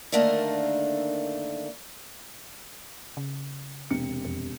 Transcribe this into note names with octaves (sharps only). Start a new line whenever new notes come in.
D3 D#3 A3 A#3 D4
C#3
E1 C3 C#7
F2